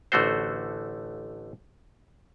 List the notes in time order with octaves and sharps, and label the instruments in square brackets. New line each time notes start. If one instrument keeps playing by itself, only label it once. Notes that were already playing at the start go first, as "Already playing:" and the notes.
[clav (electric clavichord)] A1 D3 A3 F#4 C5